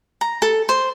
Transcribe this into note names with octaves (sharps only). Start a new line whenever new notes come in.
A#5
A4
C5